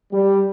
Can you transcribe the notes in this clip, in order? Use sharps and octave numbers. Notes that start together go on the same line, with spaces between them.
G3